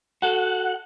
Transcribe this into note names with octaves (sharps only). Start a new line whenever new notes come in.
F#4 A4 F#5